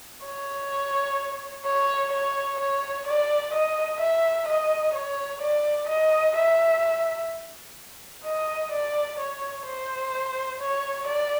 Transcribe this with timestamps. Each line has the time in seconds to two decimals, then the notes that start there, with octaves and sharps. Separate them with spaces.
0.25 C#5
1.66 C#5
2.13 C#5
2.60 C#5
3.07 D5
3.54 D#5
4.01 E5
4.48 D#5
4.95 C#5
5.42 D5
5.89 D#5
6.36 E5
8.25 D#5
8.72 D5
9.20 C#5
9.66 C5
10.60 C#5
11.07 D5